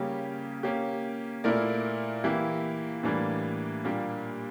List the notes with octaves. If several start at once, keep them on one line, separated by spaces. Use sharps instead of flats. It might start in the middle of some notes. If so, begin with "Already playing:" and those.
Already playing: C#3 G3 A#3 C#4 G4
A#3 C#4 G4
A#2 A3 E4 A#4 D5
E3 A#3 E4 G4
A2 E3 G3 A#3 D4
A#2 G3 A#3 D4 G4